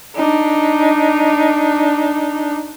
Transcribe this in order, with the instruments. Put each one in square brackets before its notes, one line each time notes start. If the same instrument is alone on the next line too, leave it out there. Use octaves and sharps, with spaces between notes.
[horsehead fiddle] D4 D#4